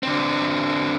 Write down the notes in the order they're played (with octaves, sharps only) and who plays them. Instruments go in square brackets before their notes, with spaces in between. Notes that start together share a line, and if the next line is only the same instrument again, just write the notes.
[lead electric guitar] D3 C4